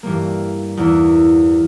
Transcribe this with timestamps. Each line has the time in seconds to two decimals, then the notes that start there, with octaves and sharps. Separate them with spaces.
0.03 G2 E3 G3 A#3
0.77 E2 E3 A#3 E4